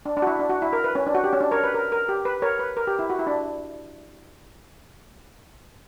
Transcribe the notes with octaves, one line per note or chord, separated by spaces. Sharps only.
D4
D4
F#4
E4
D4
F#4
E4
A#4
B4
C#4
D4
F#4
G4
C#4
D4
A#4 C#5
B4
A#4
A#4
G4
B4
A#4 C#5
B4
A#4
G4
E4
F#4
E4
D4